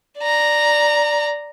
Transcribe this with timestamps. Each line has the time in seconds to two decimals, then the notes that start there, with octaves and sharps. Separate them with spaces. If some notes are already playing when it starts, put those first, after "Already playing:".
0.19 D5 A#5